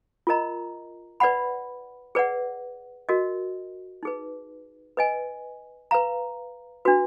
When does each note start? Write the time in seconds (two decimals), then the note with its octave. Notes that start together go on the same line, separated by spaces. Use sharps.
0.27 F4 A#4 D#5 A#5
1.20 B4 D5 F#5 B5
2.15 G#4 B4 D5 F#5
3.09 F#4 A#4 D#5
4.03 D#4 G#4 B4
4.97 B4 D#5 G#5
5.91 B4 F5 A#5
6.85 D4 F#4 B4